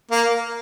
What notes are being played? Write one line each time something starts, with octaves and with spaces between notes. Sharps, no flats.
A#3